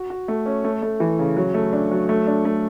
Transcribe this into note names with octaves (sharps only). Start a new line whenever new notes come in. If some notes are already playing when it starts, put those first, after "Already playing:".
Already playing: F#4
F#4
A3
C#4
A3
A3
E3
C#3
F#3
A3
D4
F#3
A3
D4
A3